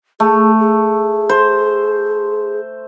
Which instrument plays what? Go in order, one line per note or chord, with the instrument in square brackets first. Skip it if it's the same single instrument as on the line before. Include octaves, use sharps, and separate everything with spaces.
[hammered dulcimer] A3 [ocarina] G#4
[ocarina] G#4
[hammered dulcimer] C5